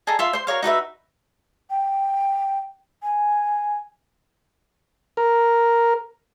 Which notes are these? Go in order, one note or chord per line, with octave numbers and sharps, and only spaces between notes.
G#4 A4 D#5 A#5
F4 E5 C6
C5 C6
F#4 A#4 C#5 F5
D#4 F#4 B4 E5
G5
G#5
A#4